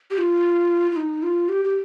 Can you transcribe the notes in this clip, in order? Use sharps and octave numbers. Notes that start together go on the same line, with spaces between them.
G4
F4
F4
D#4
F4
G4
G4